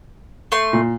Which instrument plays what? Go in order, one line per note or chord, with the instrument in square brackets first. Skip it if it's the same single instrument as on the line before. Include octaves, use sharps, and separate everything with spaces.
[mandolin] A3 C6
[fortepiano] A#2